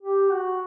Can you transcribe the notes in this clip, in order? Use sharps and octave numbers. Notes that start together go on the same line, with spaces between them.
G4
F#4